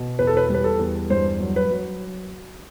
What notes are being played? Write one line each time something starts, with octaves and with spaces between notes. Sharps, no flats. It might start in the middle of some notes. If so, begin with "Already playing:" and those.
Already playing: B2
E2 B4
A4
B4
G3 B4
A4
E2
G2 C5
F#3
B4
F#3